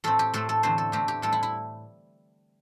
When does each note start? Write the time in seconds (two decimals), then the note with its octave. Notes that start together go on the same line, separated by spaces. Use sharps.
0.04 A2 A3 C4 A4
0.19 G4
0.34 A2 A3 C4 A4
0.49 A4
0.63 E2 D3 A3 C4 C5
0.78 A4
0.92 A2 A3 C4 G4
1.08 G4
1.22 A2 G3 C4 A4
1.32 E4
1.43 E4